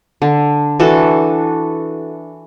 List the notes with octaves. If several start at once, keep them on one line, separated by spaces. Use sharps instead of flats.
D3
E3 D4 F#4 A4